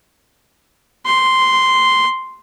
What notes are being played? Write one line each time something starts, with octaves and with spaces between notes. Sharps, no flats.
C6